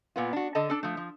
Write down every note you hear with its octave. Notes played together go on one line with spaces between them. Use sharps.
A#2 B3 F4
D4 F#4
D3 A4 D#5 A5
D4 A4
F3 A3
F3